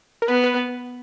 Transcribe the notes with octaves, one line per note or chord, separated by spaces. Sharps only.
A#4
B3 B4
B4